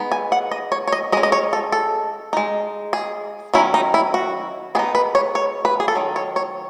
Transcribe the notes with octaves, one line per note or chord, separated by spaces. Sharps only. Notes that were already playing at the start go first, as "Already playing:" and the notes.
Already playing: G#3 B3 D#4
G#5
F#5
D#5
C#5
C#5
D#5
G#3 C#4 D#5
D#5
C#5
A4
A4
G#3 D#4
G#4
D#3 F#3 C#4 E4
D#4
E4
F#4
G#3 B3 D#4 G#4
B4
C#5
C#5
B4
G#4
A4
D#3 F#3
C#5
C#5